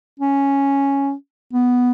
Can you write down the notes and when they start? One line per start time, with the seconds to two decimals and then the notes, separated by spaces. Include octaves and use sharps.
0.19 C#4
1.53 B3